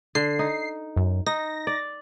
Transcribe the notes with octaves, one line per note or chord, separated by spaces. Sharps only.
D3 C7
D#4
F#2
D#4 A#6
D5